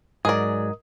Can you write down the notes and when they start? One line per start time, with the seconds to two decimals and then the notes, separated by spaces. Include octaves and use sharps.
0.25 G#2 F#3 G#4 A#4 D5 D#5 D#6